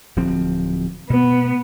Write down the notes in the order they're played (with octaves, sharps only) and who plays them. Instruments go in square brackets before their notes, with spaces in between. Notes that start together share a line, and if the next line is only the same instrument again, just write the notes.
[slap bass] D1 F3 C4
[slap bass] B2 [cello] B3